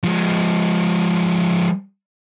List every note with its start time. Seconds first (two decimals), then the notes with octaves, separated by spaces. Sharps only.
0.04 F3 G#3